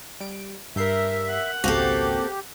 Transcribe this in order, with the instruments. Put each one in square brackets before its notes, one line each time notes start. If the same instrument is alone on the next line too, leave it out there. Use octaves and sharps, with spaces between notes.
[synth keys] G3 D7
[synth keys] G2 G6 C7 [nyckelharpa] A#4 [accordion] E5
[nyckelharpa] F#5
[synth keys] G#1 C#2 F#4 [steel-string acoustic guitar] A#3 C4 A4 [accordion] G4